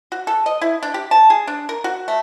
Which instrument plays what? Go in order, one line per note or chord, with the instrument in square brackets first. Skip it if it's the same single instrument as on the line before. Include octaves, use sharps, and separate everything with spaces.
[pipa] F#4
A4
D#5
E4
D4
G4
A5
G#4
D4
A#4
F#4
A3